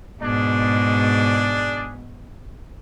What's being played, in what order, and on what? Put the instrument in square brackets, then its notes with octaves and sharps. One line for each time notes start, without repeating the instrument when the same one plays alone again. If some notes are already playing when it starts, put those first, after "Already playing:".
[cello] G#2 B2 [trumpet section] D4 G#4 D5